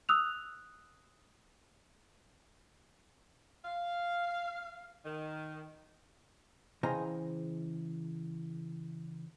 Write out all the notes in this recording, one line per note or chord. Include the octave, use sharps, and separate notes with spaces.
D#6 E6 F#6 F7
F5
D#3
C#3 E3 C5 D#5 G5 A#5